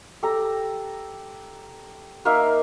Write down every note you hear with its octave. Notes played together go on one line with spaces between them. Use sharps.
G4 A4 A#5
A#3 D#4 E5 F5